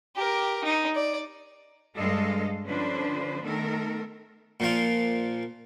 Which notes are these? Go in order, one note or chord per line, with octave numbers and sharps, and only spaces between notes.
G4 A#4
D#4
D5
G2 G3 G#3 A4 D#5 F5
D3 F3 C#4 D4 B4 C5
D#3 A3 B3 A4 A#4
A#2 F3 F4